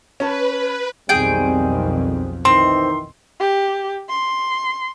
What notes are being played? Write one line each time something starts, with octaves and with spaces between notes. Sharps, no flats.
C#4 B4 A5
B1 F2 D#3 G3 C4 G#4 G5
D#3 E3 C4 D#4 C6
G4
C6